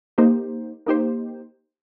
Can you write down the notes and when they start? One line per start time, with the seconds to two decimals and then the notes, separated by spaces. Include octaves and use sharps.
0.18 A#3 D#4 G4 C5
0.86 A#3 D#4 G4 C5